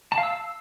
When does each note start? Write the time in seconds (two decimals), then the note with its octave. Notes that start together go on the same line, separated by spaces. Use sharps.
0.12 A5
0.18 F5
0.23 E6